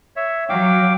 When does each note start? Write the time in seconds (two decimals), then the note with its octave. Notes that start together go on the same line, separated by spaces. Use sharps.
0.16 C#5 E5
0.49 F#3 F5 G5 D6